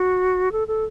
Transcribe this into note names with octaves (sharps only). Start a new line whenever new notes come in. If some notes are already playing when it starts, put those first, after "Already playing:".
Already playing: F#4
A4
A4